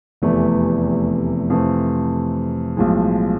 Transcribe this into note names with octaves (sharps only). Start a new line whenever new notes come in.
F1 E2 C3 E3 A3
F2 C3 E3 A3 C4
B1 A2 F3 G#3